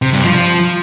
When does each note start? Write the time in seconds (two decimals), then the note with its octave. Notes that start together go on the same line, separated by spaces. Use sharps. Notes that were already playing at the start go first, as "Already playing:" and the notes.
0.02 C3
0.13 G2
0.24 F3